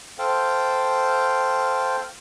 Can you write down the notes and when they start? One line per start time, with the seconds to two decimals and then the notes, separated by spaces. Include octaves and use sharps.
0.18 A4 C5 F5 G5